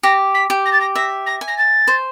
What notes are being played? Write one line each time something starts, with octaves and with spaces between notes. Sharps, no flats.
G4 A#6
B6
G4
A#6
A6
A#6
E5 A#6
A#6
G#5
A#6
A6
C5